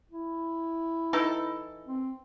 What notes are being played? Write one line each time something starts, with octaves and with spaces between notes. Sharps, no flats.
E4
E3 D#4 A4
C4